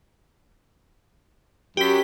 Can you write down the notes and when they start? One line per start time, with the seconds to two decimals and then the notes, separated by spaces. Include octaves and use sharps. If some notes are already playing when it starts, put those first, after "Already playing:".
1.77 F#2 G4 B6